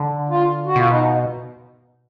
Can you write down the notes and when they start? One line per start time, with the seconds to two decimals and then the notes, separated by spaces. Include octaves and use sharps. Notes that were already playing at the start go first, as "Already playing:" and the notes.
Already playing: D3
0.29 F4
0.66 F#4
0.76 B2 F4
0.89 D#4